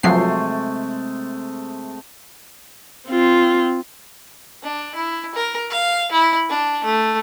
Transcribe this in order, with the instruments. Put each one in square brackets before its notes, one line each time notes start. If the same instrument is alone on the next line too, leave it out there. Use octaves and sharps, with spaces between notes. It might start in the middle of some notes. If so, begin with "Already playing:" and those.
[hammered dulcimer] C3 G#3 A3 [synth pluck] F3 F#3 C7
[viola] C4 F4
[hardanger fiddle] D4
E4
A#4
F5
E4
D4
A3